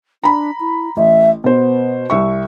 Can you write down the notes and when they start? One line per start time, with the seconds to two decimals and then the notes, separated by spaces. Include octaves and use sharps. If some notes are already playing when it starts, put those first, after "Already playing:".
0.24 D4 A#5 B5
0.60 E4
0.97 A1 E5
1.44 B2 B3 C5
2.10 C2 E5 C#6